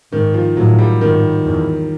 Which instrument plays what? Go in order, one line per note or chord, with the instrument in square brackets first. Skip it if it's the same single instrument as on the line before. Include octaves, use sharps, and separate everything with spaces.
[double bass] G#2 [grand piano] D#3
[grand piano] F3
[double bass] A2 [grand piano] F#3
[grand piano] G3
[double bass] G#2 [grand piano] D#3
[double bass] E2